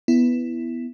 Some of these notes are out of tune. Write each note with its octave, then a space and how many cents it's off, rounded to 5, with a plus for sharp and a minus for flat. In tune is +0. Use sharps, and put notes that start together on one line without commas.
B3 +0 E4 +5